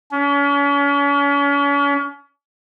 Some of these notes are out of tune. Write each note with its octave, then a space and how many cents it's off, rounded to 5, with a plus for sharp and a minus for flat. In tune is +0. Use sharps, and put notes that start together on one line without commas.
C#4 +40